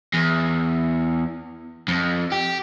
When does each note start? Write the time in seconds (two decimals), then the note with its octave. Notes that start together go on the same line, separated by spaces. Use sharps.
0.13 E2
1.88 F2
2.32 G4